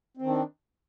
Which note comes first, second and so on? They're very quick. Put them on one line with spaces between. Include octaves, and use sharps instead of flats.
C4 D#3 D4